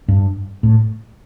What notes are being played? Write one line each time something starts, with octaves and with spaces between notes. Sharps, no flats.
G2
A2